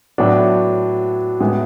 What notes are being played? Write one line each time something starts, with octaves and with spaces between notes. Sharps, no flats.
A2 F#3 B3 D4 F#4
A2 G#3 B3